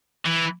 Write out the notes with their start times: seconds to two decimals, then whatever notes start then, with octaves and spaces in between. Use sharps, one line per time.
0.25 E3